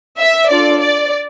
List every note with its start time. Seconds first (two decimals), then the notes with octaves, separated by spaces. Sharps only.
0.19 E5
0.49 D4 F4 A4 D5
0.79 D5